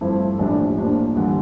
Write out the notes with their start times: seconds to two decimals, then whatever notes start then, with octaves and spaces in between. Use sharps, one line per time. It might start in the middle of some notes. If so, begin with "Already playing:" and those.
0.01 G2 F3 A3 C4 E4
0.39 A#1 A2 G3 D4
0.77 A2 F3 A#3 D4
1.15 A1 G2 D3